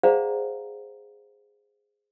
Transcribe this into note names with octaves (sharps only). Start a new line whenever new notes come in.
G#4 C5 D5 F5 F#5 A#5